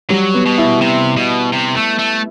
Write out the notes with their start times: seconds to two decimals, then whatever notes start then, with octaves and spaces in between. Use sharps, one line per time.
0.10 F#3 G3
0.34 B3
0.46 B2
0.58 E4
0.81 C3
1.17 B2
1.53 C3
1.76 A3
1.99 A3